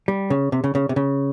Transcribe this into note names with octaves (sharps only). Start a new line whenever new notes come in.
G3
C#3
C3
C#3
C#3
C3
C#3